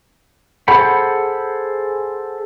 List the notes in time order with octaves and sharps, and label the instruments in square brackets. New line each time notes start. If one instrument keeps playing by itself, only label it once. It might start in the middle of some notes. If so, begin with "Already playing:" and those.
[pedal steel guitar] G#4 A4 C5 F#5 B5